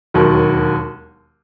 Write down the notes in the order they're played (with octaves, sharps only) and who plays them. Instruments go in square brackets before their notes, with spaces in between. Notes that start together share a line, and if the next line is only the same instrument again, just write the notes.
[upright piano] E1 D#2 D#3 F#3